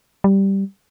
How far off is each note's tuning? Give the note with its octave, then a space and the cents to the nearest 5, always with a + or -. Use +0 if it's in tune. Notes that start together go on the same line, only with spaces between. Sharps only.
G3 -5